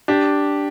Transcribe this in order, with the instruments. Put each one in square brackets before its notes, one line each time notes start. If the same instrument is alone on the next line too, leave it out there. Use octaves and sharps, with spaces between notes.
[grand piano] D4 G4